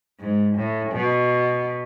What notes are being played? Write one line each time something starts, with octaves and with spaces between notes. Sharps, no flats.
G#2
A2
B2